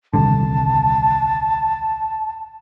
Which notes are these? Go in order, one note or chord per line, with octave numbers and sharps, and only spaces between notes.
D#1 C2 D3 A5